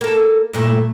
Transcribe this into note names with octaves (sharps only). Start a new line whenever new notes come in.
A#3 A4
G2 A#2 A3